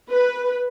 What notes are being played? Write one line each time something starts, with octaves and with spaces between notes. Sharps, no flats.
B4